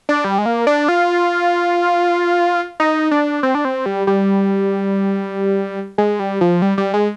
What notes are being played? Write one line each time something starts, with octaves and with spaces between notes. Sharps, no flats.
D4
G3
G#3
A#3
D4
F4
D#4
D4
C4
D4
C4
G3
G3
G#3
G3
F3
G3
G3
G#3